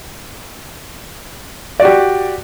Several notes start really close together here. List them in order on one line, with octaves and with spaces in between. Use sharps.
D5 F#4 G4